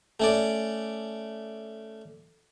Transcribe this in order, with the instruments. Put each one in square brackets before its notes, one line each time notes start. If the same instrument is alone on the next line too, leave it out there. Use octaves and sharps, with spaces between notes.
[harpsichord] A3 C#4 D5